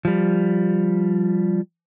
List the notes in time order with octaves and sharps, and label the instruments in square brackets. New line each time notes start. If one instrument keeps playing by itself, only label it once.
[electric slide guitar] F3 G3